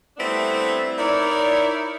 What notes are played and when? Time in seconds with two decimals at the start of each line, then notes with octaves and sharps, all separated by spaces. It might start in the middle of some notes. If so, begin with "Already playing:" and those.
0.17 G3 A3 B3 C4 D4 E4
0.97 D#4 E4 A#4 C#5 D5